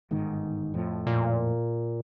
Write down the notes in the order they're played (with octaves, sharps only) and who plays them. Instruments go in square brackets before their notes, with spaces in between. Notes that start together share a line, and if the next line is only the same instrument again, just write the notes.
[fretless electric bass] G1 G#2 D#3
F2 A2 F3
[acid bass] A#2